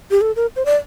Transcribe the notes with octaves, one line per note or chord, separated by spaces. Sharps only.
G4
A4
A#4
C5
D5